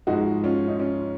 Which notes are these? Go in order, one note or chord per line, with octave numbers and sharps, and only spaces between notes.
G#2 F3 G#3 D#4 F#4
C#4 F4
D#4
C#4 F4